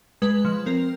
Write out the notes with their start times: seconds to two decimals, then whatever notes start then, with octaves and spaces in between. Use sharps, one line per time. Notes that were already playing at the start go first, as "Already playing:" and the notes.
0.22 G#3 B4
0.45 F3
0.66 C4 A#4